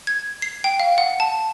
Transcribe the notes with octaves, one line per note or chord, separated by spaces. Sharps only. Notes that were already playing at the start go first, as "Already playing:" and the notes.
G#6
C7
G5
F5
F#5
A5